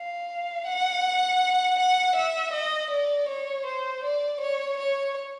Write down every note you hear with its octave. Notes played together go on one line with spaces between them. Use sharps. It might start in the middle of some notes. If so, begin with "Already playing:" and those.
Already playing: F5
F#5
F#5
E5
D#5
D5
C#5
C5
D5
C#5
C#5